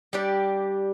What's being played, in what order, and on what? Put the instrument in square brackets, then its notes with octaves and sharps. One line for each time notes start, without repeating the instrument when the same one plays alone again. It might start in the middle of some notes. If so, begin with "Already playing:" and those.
[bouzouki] G3 D4 G4 D5